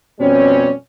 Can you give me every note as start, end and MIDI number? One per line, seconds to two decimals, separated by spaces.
0.19 0.71 41
0.19 0.71 47
0.19 0.71 55
0.19 0.71 60
0.19 0.71 61